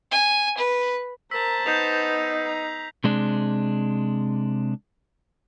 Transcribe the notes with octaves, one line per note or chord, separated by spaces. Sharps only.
G#5
B4
A#4 C5 A5 A#5 E6 B6
B3 D#4 G6 C7 F7
A#5
C3 G#3 D4